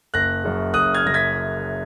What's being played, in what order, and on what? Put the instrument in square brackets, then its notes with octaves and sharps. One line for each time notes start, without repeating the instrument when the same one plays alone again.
[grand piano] F#1 F#6 A#6
F#2 C#3
F#1 D#6 F#6
F6 G#6
F#2 C#3 A#6
G#6 B6